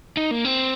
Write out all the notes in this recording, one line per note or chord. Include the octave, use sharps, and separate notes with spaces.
D#4
A#3
C4